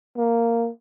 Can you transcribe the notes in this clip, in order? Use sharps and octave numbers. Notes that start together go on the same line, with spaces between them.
A#3